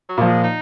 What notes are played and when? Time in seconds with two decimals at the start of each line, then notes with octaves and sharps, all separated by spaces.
0.09 F#3
0.18 A#2 F3
0.27 G#3
0.44 D#4